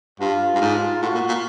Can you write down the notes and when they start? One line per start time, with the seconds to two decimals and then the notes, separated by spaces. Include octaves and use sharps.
0.20 G2 F4
0.55 G2
0.61 G#2
1.02 A2 F#4
1.15 A#2
1.28 A#2